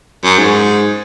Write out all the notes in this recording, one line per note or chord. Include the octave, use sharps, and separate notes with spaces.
F#2
G#2